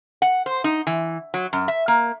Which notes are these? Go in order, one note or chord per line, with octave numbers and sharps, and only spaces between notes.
F#5
C5
D#4
E3
F#3
F#2
E5
A#3